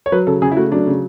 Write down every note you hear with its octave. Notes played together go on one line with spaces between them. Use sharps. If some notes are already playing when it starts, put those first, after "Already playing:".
C#5
F#3 B4
C#3 A4
C#3 G#4
E4
A3 F#4
F#3 D4
C#3